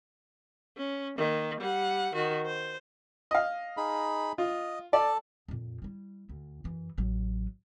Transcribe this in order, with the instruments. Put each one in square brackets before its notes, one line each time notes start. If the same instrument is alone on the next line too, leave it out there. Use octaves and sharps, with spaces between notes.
[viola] C#4
D#3 A#3
G3 F#5
D#3 F#4
C5
[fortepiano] D#5 F5
[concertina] D#4 G#4 B5
[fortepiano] F4 [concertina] D#5
[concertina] A4 A5 [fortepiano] D5
[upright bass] F2 A#2
G3 E4
D2
F#2 E3
A1 F#3